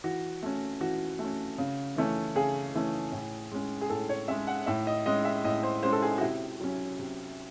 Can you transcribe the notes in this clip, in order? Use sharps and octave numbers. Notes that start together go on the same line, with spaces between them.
E3 F#4
A3 C#4
E3 F#4
A3
C#4
C#3
E3 A3 C#4
C#3 G#4
E3 A3 C#4
A2
G#3 C#4
G#4
A2 A4
C#5
G#3 C#4 E5
F#5
A2 E5
D#5
G#3 C#4 D#5
E5
A2 D#5
C5
G#3 C#4 C5
A4
G#4
F#4
C3 E4
F#3 C#4
C3